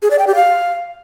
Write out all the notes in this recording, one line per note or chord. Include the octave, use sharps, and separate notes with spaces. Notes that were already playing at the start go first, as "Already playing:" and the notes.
G#4
D5
G5
G4
F5